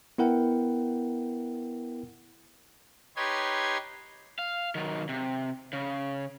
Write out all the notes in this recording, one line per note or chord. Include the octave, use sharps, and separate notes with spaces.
B3 E4 A#4 F#5 G5
D#4 G4 B4 C#5 C6 G#6
F5
D#3 F#3
C3
C#3